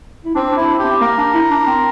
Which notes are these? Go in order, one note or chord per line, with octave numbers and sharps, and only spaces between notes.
E4
C4 D4
D4
E4
D4
G4
C4
A#3 A#4
D4
E4
D4
C4